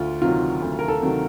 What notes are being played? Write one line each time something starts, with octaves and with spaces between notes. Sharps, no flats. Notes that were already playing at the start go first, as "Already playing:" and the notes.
Already playing: D2 F4
C3 D#3 F#3 F4
D2
A#4
A4
C3 D#3 F#3